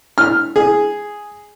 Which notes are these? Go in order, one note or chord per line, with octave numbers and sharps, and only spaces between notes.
F6
G#4